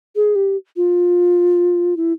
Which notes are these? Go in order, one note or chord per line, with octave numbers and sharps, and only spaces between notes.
G#4
G4
F4
E4